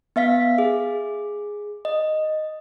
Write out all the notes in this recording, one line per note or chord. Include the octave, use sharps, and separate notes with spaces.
B3 E5 F5 B6
G#4
D#5